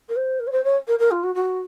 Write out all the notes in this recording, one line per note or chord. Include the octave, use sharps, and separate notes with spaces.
A#4
C5
A#4
C#5
C5
C#5
A#4
A#4
F4
F#4
F#4